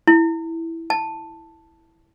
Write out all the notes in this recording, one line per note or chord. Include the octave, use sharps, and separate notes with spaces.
E4
A5